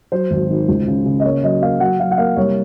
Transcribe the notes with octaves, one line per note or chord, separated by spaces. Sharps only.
F#3 C5
G#1
D#3
C#2
C#3
C#3
D#5
A#3 C#5
F#3 D#5
A#3 F5
F#3 F#5
F#3 F5
F#5
A#3 F5
C2 C#5